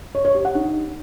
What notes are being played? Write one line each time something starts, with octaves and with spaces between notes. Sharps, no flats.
C#5
C#5
G4
F#5
D#4